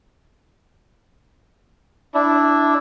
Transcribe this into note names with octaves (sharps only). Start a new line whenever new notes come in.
D4 E4